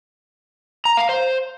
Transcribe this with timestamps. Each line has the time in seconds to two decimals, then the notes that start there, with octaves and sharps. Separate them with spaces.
0.85 A#5
0.97 F5
1.09 C5